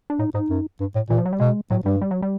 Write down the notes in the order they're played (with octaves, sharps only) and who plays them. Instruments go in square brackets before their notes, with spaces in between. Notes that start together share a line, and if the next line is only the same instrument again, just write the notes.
[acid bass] D4
[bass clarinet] A2 [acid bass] D#4
[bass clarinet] G#2 [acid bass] D#4
[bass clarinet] F#2
G2
A2
[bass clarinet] A#2 [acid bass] E3
[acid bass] F3
F#3
G3
[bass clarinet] B2 [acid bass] G#3
[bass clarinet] A2 [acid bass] F#3
[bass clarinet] G2 [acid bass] G3
[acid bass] G3
F#3
G3